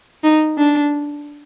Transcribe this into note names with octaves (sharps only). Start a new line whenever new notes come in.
D#4
D4